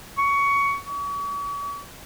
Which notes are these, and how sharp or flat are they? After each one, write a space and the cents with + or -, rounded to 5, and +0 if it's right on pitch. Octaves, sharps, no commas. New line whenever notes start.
C#6 +15
C#6 +40